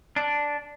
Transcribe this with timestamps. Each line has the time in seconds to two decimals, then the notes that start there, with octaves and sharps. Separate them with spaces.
0.16 D4